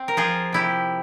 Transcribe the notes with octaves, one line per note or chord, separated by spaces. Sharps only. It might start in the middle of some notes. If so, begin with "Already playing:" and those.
Already playing: C4
A#4
F3 F4 G#4
C3 E4 G4